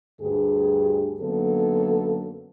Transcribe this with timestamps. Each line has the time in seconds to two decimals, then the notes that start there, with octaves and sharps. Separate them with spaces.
0.20 D2 G2 G4 G#4
1.19 F#2 D3 A#3 B3 A4